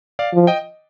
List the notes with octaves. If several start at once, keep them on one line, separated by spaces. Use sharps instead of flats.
D5 F5
F3
D#5 G5